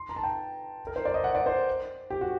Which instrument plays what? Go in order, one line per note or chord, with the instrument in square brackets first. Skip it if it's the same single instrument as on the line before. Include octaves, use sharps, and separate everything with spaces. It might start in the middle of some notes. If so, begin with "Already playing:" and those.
Already playing: [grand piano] C6
A#5
A5
G5
A#4
C5
D5
D#5
F#5
D5
C5
G4
F#4